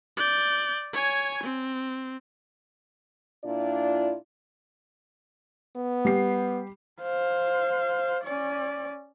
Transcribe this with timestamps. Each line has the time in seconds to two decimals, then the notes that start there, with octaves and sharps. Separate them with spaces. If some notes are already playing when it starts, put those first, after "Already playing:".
0.17 D5 G6
0.93 C#5 G#5
1.44 C4
3.44 A#2 D4 E4 F4 D5
5.76 B3
6.05 G3 G4 C7
7.02 C5 F5
8.24 C#4 D5